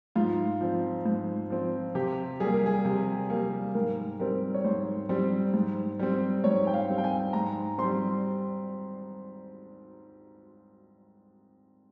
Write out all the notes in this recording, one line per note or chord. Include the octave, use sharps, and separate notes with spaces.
G#2 F4
F3 C4
G#2
F3 C4
C3 G4
G3 A#3 G#4
A#4
G#4
C3
G3 A#3
G#2 A#4
G3 C4 A#4
C#5
G#2 C5
G3 C4
G#2
G3 C4
G#2 C#5
G5
F5
G3 C4
G5
G#5
G#2 A#5
G3 C4 C6